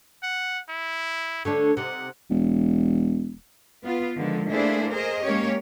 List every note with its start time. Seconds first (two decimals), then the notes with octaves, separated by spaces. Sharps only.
0.23 F#5
0.69 E4
1.45 D3 A3 D4 C#5
1.77 C3 D#4 F#5
2.30 E1
3.84 B3 F4
4.17 D3 D#3 F3 G#3
4.50 A3 A#3 D4 E4 G#4 C5
4.91 G#4 A#4 C5 D#5
5.23 G#3 A#3 C#4 G4 C#5